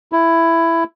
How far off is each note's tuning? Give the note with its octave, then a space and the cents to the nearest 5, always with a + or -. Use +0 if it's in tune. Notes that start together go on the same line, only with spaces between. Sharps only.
E4 +10